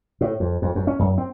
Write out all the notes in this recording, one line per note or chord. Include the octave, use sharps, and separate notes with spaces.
A2
F2
F2
F#2
C#4
F#2
C4